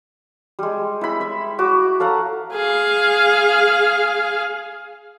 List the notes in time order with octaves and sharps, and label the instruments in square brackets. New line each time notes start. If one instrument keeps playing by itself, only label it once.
[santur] G3 G#3
E4 B5
E5
F#4 D6
A4 F5 F#5 A#5
[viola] G#4 F5